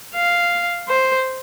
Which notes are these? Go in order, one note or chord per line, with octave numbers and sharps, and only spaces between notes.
F5
C5